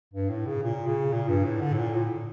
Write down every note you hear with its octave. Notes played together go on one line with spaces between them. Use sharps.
G2
A2
C#3
A#2
C#3
A#2
G2
A2
D3
A2
A#2
A2